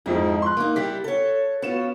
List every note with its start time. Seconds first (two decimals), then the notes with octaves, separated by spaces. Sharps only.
0.06 F2 G#2 F3 E4
0.42 C6 F#6
0.57 A#3 D#4
0.76 G3 E4 G4 B6
1.04 A4 C#5
1.62 B3 C#4 F4 F#4 E7